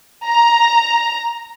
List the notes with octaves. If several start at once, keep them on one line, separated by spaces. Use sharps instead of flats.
A#5